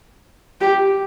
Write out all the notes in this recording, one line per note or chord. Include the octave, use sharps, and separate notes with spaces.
G4